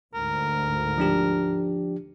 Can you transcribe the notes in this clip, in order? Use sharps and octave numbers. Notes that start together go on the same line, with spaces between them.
D2 G#2 A#4
F3 D4 G4